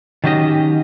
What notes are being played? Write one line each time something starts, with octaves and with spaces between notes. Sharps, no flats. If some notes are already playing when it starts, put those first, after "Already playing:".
D#3 F#3 C#4 G4 D#5